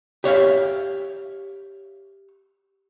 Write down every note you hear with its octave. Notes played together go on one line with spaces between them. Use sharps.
G4 C#5 E5 F5